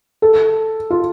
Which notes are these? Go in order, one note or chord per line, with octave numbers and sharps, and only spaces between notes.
A4
F4